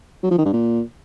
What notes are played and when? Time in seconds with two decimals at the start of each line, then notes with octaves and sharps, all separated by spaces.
0.23 F#3
0.31 F3
0.38 D#3
0.46 G2
0.53 A#2